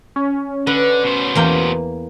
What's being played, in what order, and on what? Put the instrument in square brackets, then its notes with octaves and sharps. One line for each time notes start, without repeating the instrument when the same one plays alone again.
[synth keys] C#4
[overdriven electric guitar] D3 [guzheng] B4
[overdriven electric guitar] B2 C5
[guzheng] E2 A#3 G5